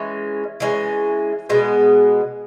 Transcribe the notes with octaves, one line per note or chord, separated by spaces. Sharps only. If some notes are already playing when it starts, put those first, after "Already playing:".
Already playing: E3 G#3 C#4
E3 G#3 C#4
B2 G#3 B3